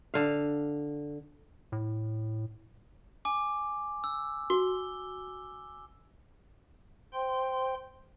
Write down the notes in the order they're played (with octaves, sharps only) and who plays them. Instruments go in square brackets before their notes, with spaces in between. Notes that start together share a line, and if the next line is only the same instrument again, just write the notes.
[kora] D3 F5
[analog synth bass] A2
[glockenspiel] G#5 D6
E6
[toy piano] F#4 [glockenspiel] G7
[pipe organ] C5 G5 C6